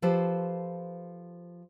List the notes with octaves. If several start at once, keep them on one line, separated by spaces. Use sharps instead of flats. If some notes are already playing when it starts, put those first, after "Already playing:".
F3 G4 A4 B4 C5